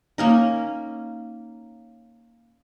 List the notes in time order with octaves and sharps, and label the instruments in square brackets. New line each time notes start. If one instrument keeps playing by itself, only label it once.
[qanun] A#3 C#4 D#4